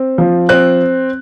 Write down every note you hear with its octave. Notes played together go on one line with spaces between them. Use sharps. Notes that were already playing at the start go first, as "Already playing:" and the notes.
Already playing: C4
F3
C4 F#6